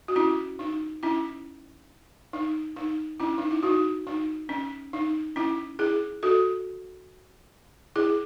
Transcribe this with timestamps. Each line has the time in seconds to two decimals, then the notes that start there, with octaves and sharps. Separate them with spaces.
0.08 F#4
0.16 C#4 E4
0.59 D#4
1.03 C#4 E4
2.33 D#4
2.76 D#4
3.20 C#4 E4
3.38 D#4
3.51 E4
3.63 D#4 F#4
4.07 D#4
4.49 C#4
4.93 D#4
5.36 C#4 E4
5.79 E4 G#4
6.23 F#4 A4
7.96 E4 G#4